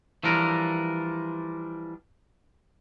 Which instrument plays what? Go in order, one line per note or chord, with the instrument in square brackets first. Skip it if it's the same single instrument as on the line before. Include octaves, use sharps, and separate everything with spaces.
[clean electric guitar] E3 F3 G3 D4 A#4